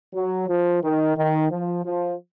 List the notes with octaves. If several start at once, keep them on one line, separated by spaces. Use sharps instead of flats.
F#3
F3
D#3
D#3
F3
F3